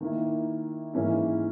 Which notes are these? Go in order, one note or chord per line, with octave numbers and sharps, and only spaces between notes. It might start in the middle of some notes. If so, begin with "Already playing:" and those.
D#3 A#3 E4
G#2 E3 A#3 C#4 E4